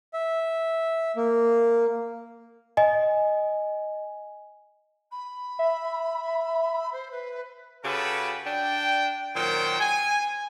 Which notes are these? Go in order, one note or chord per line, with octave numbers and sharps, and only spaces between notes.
E5
A#3
D#5 G#5
B5
E5
C5
B4
C#3 F#4 G4 A4 B4
D4 G5
A#2 D#3 F#3 C5 G5
G#5